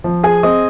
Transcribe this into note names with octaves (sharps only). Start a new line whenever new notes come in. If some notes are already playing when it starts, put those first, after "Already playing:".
F3
G#4 G#5
C4 D#5